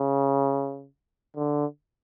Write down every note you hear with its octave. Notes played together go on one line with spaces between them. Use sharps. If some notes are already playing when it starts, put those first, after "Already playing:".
Already playing: C#3
D3